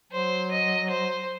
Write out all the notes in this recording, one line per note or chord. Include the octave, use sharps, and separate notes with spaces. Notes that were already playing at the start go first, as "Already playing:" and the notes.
F#3 C5
D#5
C5